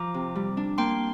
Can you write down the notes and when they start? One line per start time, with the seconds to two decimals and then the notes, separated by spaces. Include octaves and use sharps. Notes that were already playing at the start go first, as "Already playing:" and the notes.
Already playing: F3 A#5 D6
0.14 C3
0.36 G3
0.57 D4
0.78 A#3 G5 C6